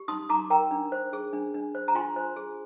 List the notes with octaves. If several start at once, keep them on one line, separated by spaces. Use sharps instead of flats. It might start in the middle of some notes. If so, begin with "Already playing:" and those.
Already playing: G4
D#4 C6 D#6
D#4 A#5 D6
A#4 G5 A#5
D4
C5
G#4
D4
D4
C5
A#5
F4 G#5 C6
C5
G#4